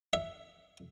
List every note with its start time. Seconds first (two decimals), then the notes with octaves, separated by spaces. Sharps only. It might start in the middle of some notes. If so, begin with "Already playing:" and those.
0.13 E5